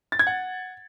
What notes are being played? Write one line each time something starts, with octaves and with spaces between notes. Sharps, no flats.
A6
G#6
F#5